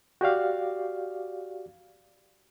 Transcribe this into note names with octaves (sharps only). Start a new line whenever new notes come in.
F#4 G4 D5 F5